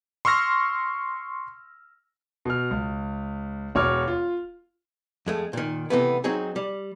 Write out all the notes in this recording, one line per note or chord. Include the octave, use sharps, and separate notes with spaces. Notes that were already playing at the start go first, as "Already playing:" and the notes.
C6 C#6 E6 F6 A#6
B2 F6
C#2
E1 C#5 D6 F6
F4
F2 G#3 A3
A#2 D#3
C3 E3 A3 B3
F#3 C4 D#4 G#4
G3